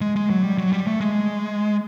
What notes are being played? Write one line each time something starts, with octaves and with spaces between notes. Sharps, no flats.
G#3
G#3
F#3
G3
F#3
G3
A3
G#3